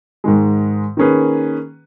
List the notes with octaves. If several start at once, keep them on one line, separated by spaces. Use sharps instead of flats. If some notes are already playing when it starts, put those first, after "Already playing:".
G#2 D#3 G#3
D#3 A#3 C#4 G#4 B4